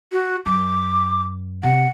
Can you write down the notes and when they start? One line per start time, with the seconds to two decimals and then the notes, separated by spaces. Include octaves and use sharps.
0.12 F#4
0.46 F#2 D6
1.63 C3 C4 F#5